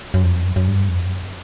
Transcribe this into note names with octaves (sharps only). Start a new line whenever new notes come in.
F#2
F2
F#2
F#2
G2
F2
F#2